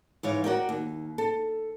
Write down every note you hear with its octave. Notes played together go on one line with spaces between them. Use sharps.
G#2 E3 C#5 F5
F#4 A#4 D5 G5
D#2
A4